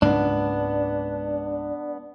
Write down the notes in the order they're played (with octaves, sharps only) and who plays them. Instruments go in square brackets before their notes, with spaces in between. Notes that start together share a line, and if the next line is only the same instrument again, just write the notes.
[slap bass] C#2 G#2 A#3 [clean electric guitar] B3 D4